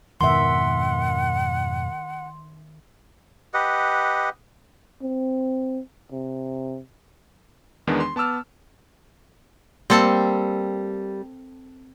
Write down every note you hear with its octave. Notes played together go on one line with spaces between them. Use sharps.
F2 G#2 B2 D#3 E5 F#5 C6
G4 B4 D#5 F#5
C4
C3
E2 D#3 E3 G#3 B3 D4
C6
B3 A5 D6 E6 F6
G3 A#3 C4 A4 A5